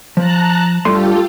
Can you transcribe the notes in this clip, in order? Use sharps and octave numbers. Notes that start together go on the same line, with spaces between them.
F3 A5 A#5 F#6
G2 A3 F4 G4 A4 C6